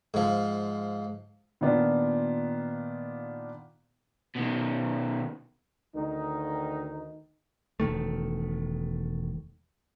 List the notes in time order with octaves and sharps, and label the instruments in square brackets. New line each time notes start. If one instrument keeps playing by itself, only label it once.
[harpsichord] G#2 F3
[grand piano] A#2 D#3 B3 D4 F4
[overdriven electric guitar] B2 D#3
[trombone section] D2 D#3 D#4
[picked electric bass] E1 D#3 A3